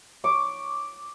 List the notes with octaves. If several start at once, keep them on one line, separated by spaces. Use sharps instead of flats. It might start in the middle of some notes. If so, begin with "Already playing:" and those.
C#6 D6